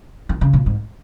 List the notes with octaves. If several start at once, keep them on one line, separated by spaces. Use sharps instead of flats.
D#3
C#3
A#2
G#2